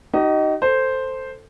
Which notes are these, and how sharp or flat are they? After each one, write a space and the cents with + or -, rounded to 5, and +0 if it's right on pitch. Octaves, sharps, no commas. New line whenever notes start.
D#4 +0 G4 -45 D#5 +0
A4 +15 C5 +0